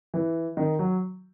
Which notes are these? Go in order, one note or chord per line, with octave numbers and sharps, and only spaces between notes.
E3
D#3
F#3